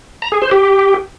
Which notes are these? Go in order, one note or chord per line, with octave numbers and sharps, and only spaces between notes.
A#5
G#4
C5
G4